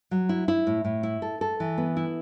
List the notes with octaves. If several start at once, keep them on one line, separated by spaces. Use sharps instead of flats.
F#3
E4
E4
A2
A2
E4
A4
A4
E3
B3
E4